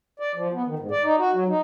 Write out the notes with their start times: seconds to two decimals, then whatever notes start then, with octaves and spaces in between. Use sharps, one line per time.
0.20 D5
0.35 F3
0.53 B3
0.67 D#3
0.79 G#2
0.91 D5
1.03 D#4
1.19 F#4
1.34 F#3
1.49 D#4